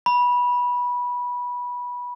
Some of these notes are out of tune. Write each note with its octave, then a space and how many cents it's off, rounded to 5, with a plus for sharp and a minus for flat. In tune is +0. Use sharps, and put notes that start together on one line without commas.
B5 -15